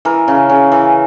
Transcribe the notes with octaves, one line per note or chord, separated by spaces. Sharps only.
E3 A#4
C#3
C#3
E3